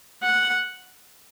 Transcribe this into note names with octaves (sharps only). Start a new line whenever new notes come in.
F#5